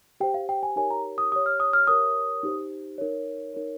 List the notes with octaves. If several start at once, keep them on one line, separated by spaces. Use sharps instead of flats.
G4 C5 G5
F5
G5
G#5
D#4 G4 A#4 C#5 G#5
A#5
D#6
G4 C#5 D#6
F6
D#6
F6
G4 A#4 C#5 D#6
D#4 G4 C5
D#4 A#4 C#5
D#4 A#4 C#5